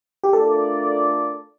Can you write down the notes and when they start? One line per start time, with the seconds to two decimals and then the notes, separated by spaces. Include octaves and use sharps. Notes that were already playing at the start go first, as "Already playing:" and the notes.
0.24 G4
0.33 A3 D4 F4 A4 A#4 D5